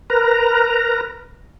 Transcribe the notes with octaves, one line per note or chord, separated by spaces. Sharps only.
A#4 B4 A#5